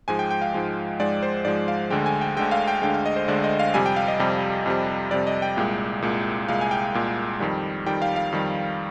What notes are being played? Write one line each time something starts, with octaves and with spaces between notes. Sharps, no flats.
G#2 F3 G#3 G#5
G5
G5
F5
G#2 F3 G#3
G#2 F3 G#3 D5
C5
G#2 F3 G#3 D5
F5
D2 D3 G#3 G5
G#5
G5
D2 D3 G#3 G5
F5
G5
D2 D3 G#3 G5
F5
D#5
C5
D2 D3 G#3 D5
D#5
F5
F2 C3 G3 G#5
G5
F5
D#5
F2 C3 G3
F2 C3 G3
F2 C3 G3 D5
D#5
G5
C2 A#2 G#3
C2 A#2 G#3
C2 A#2 G#3 F5
G#5
G5
C2 A#2 G#3
F2 D#3 G3
F2 D#3 G3 G5
F5
F5
F2 D#3 G3